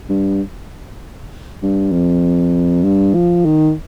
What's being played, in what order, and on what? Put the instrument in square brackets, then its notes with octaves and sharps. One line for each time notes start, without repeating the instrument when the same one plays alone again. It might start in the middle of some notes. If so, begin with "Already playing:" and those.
[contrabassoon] G2
G2
F2
G2
F3
D#3